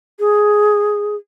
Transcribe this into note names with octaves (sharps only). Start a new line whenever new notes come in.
G#4